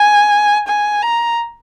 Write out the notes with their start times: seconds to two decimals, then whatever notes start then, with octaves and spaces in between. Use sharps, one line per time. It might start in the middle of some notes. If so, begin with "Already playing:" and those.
Already playing: G#5
0.68 G#5
1.02 A#5